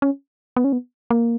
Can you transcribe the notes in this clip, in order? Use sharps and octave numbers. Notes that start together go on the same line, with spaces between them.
C#4
B3
C#4
B3
A#3